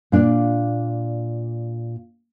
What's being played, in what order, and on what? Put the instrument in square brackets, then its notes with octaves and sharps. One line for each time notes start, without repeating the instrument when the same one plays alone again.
[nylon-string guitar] A#2 D4 F4 D5